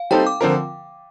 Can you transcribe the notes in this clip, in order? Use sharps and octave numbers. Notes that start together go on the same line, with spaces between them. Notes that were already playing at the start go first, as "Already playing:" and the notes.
Already playing: F5
G3 C4 D#4 A4 C5 G5
D6
D3 F3 C4 F4 A#4